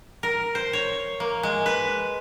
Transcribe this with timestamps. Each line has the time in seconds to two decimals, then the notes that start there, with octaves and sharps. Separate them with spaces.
0.23 A#4
0.55 C5
0.73 C#5
1.20 A#3
1.43 G#3
1.66 B4